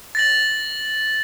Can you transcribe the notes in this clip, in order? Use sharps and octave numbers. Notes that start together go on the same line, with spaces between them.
A6 A#6 F#7